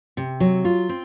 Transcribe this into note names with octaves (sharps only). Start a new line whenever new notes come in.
C3
F#3
F4
C4